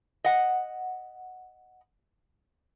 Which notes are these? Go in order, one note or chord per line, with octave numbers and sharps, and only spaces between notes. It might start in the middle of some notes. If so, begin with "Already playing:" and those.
D#5 F#5